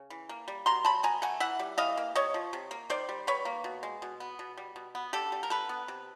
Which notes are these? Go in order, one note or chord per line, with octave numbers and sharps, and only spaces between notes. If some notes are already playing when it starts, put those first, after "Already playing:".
Already playing: C#3
E3
A#3
G3
B2 A#5 C6
F#3 A5 B5
B2 G#5 A#5
A3 F#5 G#5
E3 E5 F#5
G3
E3 D#5 F5
A#3
C3 C#5 D#5
F3
C3
A#3
D#3 C5 D5
G3
D#3 B4 C#5
A#3
B2
G#3
B2
B3
B2
G3
B2
B3
D3 G4 A4
G3
A#4
D3 A4 B4
B3
C3